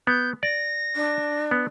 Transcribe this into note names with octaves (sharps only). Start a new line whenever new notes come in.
B3 G6
D5 A#6
D4
B3